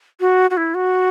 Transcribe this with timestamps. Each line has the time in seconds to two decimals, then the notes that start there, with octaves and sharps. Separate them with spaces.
0.20 F#4
0.50 F#4
0.57 E4
0.74 F#4